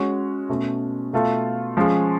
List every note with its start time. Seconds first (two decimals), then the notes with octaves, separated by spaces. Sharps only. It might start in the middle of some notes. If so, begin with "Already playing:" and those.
Already playing: G#3 C#4 F#4 C#5
0.49 B2 A3 C#4
1.13 B2 A3 F4 A4
1.77 F3 G#3 C#4 G#4